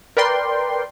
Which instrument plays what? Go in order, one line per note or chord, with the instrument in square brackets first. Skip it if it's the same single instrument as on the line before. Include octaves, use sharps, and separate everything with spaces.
[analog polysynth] A#4 B4 D5 G5 C6